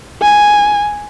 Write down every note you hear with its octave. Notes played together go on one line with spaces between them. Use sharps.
G#5